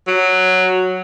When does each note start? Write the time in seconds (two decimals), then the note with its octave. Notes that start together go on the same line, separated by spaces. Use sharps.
0.07 F#3